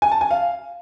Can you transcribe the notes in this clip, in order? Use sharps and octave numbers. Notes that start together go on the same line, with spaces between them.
G#5
A5
G#5
F5